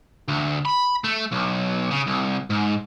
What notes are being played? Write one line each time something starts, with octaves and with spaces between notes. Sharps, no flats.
D2
B5
A3
B1
C#3
C2
G#2